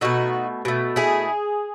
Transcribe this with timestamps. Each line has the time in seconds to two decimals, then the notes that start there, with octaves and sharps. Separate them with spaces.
0.01 B2 A3 D#4 F#4
0.65 B2 A3
0.96 E4 G#4